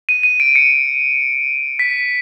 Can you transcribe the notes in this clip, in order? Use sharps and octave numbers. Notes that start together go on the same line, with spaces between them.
D#7
D#7
D7
C#7
B6